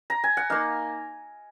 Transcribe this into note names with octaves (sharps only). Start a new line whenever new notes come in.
A#5
G#5
F#5
A#3 D#4 F5